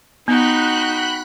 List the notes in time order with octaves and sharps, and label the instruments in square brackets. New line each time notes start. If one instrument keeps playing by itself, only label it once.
[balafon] B3 [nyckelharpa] D#4 [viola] F#4 G5 [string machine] B5 F#6